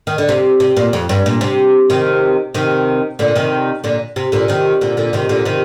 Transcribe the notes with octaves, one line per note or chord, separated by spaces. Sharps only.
D#3
D3
C3
C3
A#2
F2
G2
A#2
C3
C3 D#3
C3 D#3
A#2 D3
C3 D#3
A#2 D3
C3
A#2 D3
C3 D#3
A#2 D3
A#2 D3
C3 D#3
A#2 D3
C3 D#3